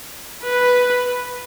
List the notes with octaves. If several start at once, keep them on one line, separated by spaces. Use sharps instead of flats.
B4